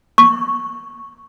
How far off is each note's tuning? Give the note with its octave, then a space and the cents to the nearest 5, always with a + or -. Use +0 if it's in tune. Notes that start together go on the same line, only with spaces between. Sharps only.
C#6 -5